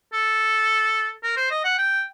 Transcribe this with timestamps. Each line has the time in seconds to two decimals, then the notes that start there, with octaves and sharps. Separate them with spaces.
0.13 A4
1.23 A#4
1.37 C5
1.51 D#5
1.64 F#5
1.78 G5